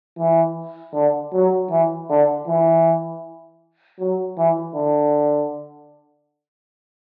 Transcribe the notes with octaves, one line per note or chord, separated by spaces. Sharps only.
E3
D3
F#3
E3
D3
E3
F#3
E3
D3